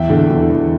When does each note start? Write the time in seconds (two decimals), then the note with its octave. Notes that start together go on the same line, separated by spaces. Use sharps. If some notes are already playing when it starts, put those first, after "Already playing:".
Already playing: E2 E5 G5
0.09 D3
0.30 E2
0.50 E2